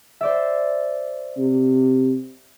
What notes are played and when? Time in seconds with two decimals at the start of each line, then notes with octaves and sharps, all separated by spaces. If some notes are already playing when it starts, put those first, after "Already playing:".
0.21 C5 D5 E5
1.38 C3